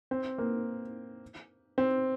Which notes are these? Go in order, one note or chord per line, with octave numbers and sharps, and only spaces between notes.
C4
A#3
C4